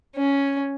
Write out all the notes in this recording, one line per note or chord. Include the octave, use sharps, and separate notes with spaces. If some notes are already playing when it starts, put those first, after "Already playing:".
C#4